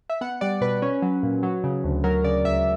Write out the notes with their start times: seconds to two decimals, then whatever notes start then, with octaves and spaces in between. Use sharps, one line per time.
0.10 E5
0.21 B3 F#5
0.41 G3 D5
0.61 B2 B4
0.82 C#4
1.02 F#3
1.23 A#2
1.43 F#3
1.64 C#3
1.84 D2
2.04 F#3 A#4
2.24 C#3 D5
2.44 C#2 E5